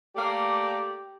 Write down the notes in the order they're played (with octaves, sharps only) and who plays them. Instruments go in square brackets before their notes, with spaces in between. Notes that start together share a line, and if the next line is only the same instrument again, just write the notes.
[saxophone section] A3 A#3 D5 [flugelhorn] G4